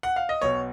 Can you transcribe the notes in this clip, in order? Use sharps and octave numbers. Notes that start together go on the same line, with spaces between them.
F#5
F5
D#5
B1 B2 C#5